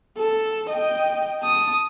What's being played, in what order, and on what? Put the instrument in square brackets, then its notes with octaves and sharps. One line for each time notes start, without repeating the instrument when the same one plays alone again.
[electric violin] A4
D#5 G5
A5 D#6